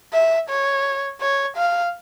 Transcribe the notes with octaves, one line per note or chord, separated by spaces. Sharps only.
E5
C#5
C#5
F5